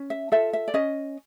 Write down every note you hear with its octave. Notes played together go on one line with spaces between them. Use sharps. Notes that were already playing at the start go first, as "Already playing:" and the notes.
Already playing: C#4
E5
F4 A4 E5
E5
D5
C#4 D#5